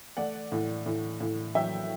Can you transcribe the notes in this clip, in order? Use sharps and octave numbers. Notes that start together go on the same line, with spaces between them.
A3 D5 F#5
A2
A2
A2
F#3 E5 G5